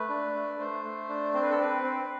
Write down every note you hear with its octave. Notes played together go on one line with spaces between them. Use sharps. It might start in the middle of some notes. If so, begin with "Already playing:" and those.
Already playing: A3 B4
D4
A3
A3 C5
A3
D4
C4 C5
B4
A4
C4 B4
C4